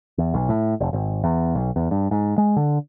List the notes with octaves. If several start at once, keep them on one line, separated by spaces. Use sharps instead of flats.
E2
B1
A2
F1
G#1
E2
B1
E2
G2
G#2
G#3
D3